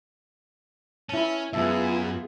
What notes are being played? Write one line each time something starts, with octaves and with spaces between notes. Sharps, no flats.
C#4 E4 A5
F#2 B3 F4 G#4 E5 A5